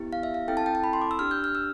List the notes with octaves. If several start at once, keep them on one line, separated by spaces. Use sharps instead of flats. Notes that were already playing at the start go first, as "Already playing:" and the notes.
Already playing: B3 E4 G4
F5
E5
F5
C4 E4 A4 G5
A5
G5
A5
B5
C6
D6
E6
D4 G4 F6
G6
F6
E6